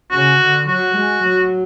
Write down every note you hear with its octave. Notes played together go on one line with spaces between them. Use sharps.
C#3 F#4
D3
F#3 F#4
G#3
F#3